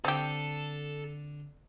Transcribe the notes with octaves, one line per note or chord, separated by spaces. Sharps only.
D3 C4 G4 A4